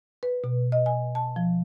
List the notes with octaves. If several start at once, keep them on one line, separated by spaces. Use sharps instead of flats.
B4
B2
D#5
G#5
A5
F3